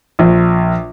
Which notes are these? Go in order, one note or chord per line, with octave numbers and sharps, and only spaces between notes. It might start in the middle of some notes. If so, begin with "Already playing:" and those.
A#1